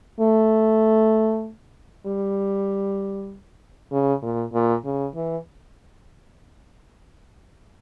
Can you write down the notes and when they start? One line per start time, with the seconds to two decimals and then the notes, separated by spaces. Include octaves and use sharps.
0.20 A3
2.06 G3
3.92 C#3
4.22 A#2
4.53 A#2
4.85 C#3
5.15 E3